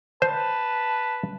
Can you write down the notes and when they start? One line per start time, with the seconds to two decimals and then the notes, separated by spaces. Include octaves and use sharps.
0.22 B4 C5 A5